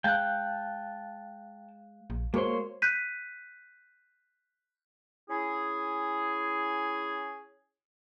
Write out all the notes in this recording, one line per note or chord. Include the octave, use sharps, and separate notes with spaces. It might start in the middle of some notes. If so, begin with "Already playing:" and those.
G#3 F5 G5 A5 F#6
A#1
G#3 A#3 F#4 C5 C#5 C6
F#6 G6 B6 D#7
C#4 E4 G#4